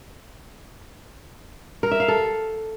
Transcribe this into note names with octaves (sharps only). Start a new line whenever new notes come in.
A#4
E5
F5
A4